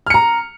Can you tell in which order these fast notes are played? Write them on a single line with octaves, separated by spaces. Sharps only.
F6 C#7 A#5